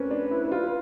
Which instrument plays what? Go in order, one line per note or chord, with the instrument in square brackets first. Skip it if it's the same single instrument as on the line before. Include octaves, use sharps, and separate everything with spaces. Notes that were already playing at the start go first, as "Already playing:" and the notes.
Already playing: [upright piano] A3 A#3 C4 C#4 [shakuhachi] B4
[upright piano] D4
E4
F4